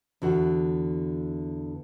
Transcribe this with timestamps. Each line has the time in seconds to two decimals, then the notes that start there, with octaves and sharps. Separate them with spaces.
0.22 E2 D3 F#4 F#5